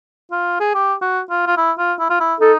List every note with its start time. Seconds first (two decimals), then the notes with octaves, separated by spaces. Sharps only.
0.32 F4
0.60 G#4
0.75 G4
1.02 F#4
1.30 F4
1.47 F4
1.57 E4
1.79 F4
1.99 E4
2.10 F4
2.20 E4
2.40 D#4 A4